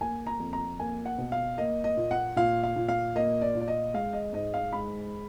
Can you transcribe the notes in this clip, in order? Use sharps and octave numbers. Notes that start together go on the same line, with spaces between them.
A#3 G#5
A#5
F2
A#5
A#3 G#5
F#5
B2
F5
A#3 D#5
D#5
A#2
F#5
A#2 F5
F5
A#2
F5
A#3 D#5
D5
A#2
D5
D#5
G#3 F5
D#5
G#2 D#5
F5
G#3 B5